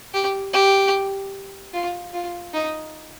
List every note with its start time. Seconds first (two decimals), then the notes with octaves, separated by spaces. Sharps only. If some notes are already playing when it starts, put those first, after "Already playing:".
0.14 G4
0.54 G4
1.73 F4
2.13 F4
2.54 D#4